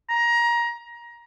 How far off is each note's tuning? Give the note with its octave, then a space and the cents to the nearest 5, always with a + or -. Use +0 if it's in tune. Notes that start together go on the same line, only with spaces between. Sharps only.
A#5 +20